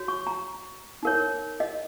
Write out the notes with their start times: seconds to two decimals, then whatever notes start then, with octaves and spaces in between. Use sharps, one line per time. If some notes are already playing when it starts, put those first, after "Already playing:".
Already playing: F#4 C#5
0.08 C#6
0.27 A#5
1.03 D#4 A#4 C#5
1.60 D#5